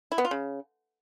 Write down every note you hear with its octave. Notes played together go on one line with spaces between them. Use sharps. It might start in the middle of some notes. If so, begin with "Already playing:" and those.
E4
B3
F4
C#3